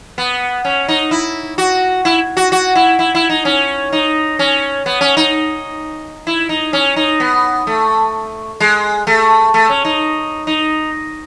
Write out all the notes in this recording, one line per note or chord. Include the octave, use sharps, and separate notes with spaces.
B3
C#4
D#4
E4
F#4
E4
F#4
F#4
E4
E4
E4
D#4
C#4
D#4
C#4
B3
C#4
D#4
E4
D#4
C#4
D#4
B3
A3
G#3
A3
A3
C#4
D#4
D#4